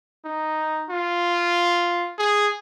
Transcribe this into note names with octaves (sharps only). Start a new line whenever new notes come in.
D#4
F4
G#4